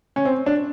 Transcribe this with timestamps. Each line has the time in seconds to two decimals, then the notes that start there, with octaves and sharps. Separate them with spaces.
0.16 C#4
0.25 C4
0.46 D4